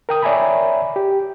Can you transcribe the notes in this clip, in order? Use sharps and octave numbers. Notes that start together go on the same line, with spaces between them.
A#4 G5 D#6
C#5 D5 E5 G#5 A#5 B5
G4